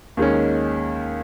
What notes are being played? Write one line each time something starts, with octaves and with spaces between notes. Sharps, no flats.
D#2 D#3 G#3 C#4